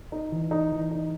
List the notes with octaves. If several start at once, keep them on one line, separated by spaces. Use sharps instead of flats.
D#4
E3
D#4
E3
D#4